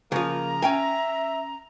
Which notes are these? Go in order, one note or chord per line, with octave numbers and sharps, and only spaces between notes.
C#3 F3 A#3 A#5
C#4 E5 G5 G#5